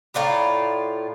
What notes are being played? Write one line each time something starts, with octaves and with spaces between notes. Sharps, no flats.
A2 F4 D5 A#5